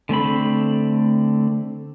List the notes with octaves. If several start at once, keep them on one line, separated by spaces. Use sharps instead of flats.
D3 A3 C4 B5